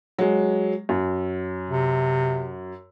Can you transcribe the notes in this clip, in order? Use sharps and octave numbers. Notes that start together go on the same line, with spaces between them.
F#3 G#3
F#2
C3